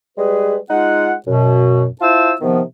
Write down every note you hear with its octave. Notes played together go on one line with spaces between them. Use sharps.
G3 G#3 G#4 B4
G#3 D#4 F4 F#5
F#2 B2
E4 F4 C5 A5 E6
C3 D#3 F3 B3